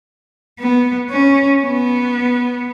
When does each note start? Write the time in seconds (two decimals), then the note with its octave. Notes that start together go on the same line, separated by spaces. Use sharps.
0.60 B3
1.11 C#4
1.62 B3